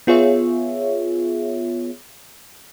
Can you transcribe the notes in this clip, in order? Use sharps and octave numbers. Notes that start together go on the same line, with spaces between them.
B3 F4 G#4 C#5 E5